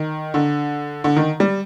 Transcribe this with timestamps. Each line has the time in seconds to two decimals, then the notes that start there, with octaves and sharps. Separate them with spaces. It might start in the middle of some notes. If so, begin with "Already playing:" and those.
Already playing: D#3
0.34 D3
1.04 D3
1.16 D#3
1.40 G3